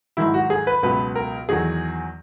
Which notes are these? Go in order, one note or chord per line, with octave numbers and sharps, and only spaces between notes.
G#2 D#3 F#3 E4
F#4
G#4
B4
C#2 B2 F#3 B4
A#4
E2 D#3 F#3 G#4